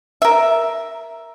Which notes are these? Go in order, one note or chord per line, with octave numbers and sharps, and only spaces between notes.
A#4 E5